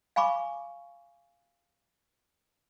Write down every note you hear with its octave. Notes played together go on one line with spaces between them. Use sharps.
F5 G#5 B5 C#6 D6